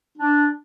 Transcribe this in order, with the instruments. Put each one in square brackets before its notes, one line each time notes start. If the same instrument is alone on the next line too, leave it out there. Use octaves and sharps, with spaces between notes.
[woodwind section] D4